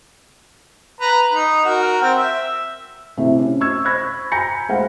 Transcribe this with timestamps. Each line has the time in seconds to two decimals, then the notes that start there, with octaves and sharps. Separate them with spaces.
1.01 B4 A#5
1.33 D#4
1.65 F#4 A#4
2.01 C4
2.14 E5
3.17 C3 A3 E4
3.38 C#4
3.61 C#6 E6 G#6
3.85 B5 C#6 E6 F#6 G#6 A#6
4.32 G#5 A#5 B5 G6 A#6 C#7
4.69 G#3 A3 C5 F5 F#5